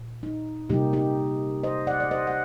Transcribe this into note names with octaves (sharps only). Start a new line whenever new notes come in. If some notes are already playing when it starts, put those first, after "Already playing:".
Already playing: A#2
D#4
C3 G3 A#3 D#4 G4
D#4 G4
C5 D#5
D5 F#5
D5
C5 D#5
F#5